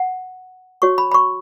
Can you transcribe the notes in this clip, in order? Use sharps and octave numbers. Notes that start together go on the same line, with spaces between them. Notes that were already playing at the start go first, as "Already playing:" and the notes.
Already playing: F#5
F#4 C#5 C#6
B5
B5
C#6